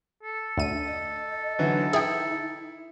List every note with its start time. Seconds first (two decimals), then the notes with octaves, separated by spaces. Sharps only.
0.23 A4
0.57 D2 D#7
0.86 D#5
1.59 D3 E3 F#3 D#4
1.93 E4 G#4 G5